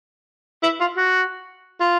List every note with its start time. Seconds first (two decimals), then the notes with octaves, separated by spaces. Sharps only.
0.63 E4
0.80 F4
0.97 F#4
1.80 F4